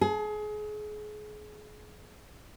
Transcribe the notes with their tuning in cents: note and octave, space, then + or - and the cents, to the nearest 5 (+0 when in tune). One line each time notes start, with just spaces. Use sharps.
G#4 +30